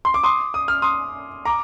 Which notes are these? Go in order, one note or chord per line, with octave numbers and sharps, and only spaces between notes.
C6
D6
C6 D#6
D#6
F6
C6 D#6
A#5 D6